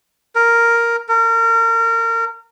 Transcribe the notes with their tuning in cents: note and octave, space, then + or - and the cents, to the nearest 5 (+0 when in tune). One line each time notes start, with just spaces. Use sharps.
A#4 +0
A#4 -30